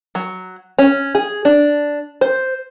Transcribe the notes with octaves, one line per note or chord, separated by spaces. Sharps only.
F#3
C#4
G#4
D4
C5